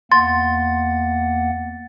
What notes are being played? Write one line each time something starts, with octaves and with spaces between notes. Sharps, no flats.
E2 A#3 F#5 C6 A6